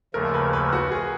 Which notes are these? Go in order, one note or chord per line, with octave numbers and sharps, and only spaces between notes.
D#2 C#3 F3 A3 A#4
B4
B4
F#4
G#4